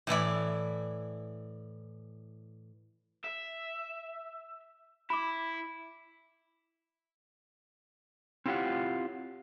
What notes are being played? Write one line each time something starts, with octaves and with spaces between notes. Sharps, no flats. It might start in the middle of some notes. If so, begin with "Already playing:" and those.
A2 E3 E4 D5
E5
E4 B5 D6
C4 E4 F4 G4 C#5 F#5